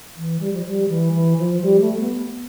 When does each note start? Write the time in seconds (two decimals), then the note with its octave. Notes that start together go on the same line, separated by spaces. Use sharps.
0.17 E3
0.40 G3
0.53 F3
0.65 G3
0.89 E3
1.13 E3
1.38 F3
1.62 G3
1.80 A3
1.99 B3